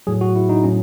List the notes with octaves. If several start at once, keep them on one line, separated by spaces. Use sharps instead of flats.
A2 F#3 G#4
F#4
E4
D#4
A2 F#3 C#4